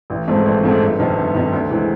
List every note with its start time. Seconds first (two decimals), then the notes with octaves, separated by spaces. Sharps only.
0.10 A1
0.28 G#2 F3 A3 C4
0.45 A1
0.63 G#2 F3 A3 C4
0.81 G1
0.99 F2 C3 D#3
1.17 G1
1.35 F2 C3 D#3
1.52 D2
1.70 C3 E3 G#3 C4